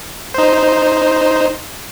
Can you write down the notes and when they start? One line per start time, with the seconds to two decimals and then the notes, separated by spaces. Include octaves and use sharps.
0.34 D#4 C5